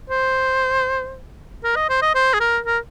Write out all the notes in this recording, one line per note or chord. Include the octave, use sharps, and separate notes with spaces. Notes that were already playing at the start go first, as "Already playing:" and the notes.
C5
A#4
D#5
C5
D#5
C5
G#4
A#4
A#4